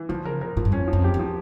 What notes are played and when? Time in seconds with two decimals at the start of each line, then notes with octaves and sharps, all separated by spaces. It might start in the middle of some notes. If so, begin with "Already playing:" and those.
Already playing: E3
0.09 D3 F3
0.25 C#3 A#4
0.41 A#2 A#4
0.57 A2 F3
0.65 G2
0.72 F2 C#4
0.87 F3
0.93 F2
1.04 G4
1.14 E2 F3